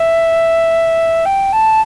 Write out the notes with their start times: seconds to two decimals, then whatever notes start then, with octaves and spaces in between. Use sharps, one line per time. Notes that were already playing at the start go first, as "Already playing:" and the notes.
Already playing: E5
1.25 G5
1.52 A5